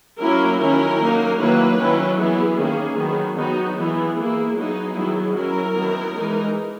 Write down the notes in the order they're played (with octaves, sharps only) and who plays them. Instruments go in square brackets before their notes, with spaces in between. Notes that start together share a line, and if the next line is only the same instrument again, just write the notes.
[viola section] F#3 A#3 C#4 E4 A#4
D#3 F#3 C#4 E4 A#4
F#3 A#3 D#4
D#3 F#3 A#3 E4 B4
D#3 F#3 C#4 E4
E3 B3 E4 G#4
D#3 A#3 C#4
D#3 F#3 B3
D#3 F#3 B3 D#4 F#4
E3 B3 E4 G#4
E3 A#3 E4
F#3 B3 D#4 G#4
D#3 F#3 B3 E4
F#3 C#4 E4 A#4
D#3 F#3 B3 E4
E3 G#3 D#4